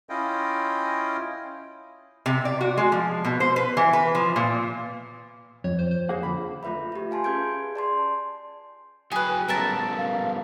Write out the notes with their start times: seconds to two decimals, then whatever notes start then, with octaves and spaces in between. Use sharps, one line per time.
0.09 C#4 E4 F4 D#5 G5
2.26 C3
2.45 D5
2.61 F#4
2.77 G#3
2.92 F3
3.25 B2
3.40 C5
3.56 B4
3.77 E3
3.93 B4
4.15 F3
4.36 A#2
5.64 F2 C#5
5.79 C5
5.91 C5
6.09 A#3 G#4 F#5
6.23 F2 D3 B5
6.63 A3 F4 B4 E5 B5
6.92 F4 G4
7.11 F5 G#5 A5 C6
7.24 C#4 G#4 B4 G6 G#6 D7
7.76 D5 A5 C6
9.12 F#3 F#4 G#4 B4 G5
9.48 G3 B3 C#4 A#4 E5 A5
9.97 F5